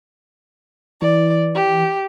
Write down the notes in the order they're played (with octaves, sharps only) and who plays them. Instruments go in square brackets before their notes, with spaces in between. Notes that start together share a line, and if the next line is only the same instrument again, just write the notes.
[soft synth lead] E3 [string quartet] D5
[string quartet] G4